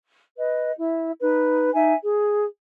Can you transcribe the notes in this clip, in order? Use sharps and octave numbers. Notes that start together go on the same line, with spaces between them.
B4 D#5
E4
D#4 B4
D#4 E5 G#5
G#4